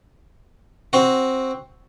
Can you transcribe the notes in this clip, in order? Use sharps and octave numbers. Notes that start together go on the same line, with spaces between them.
C4 F#4